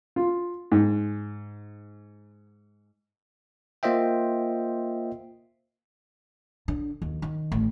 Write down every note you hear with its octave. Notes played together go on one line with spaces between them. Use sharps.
F4
G#2
A#3 F4 C5 D#5 E5 G5
D3
D#2
D#3
A1